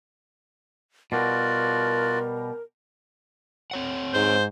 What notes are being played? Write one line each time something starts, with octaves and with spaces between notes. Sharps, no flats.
B2 G3 F4 F#4 A#4 D5
C4 C#5 F#5
G#2 C5